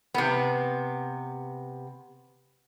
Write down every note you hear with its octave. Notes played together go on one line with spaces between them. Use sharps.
C3 B3